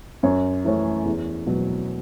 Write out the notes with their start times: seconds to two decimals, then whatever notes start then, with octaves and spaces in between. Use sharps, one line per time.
0.23 F#2 C#5
0.64 E3 A3 C#4
1.05 E2
1.47 B2 F#3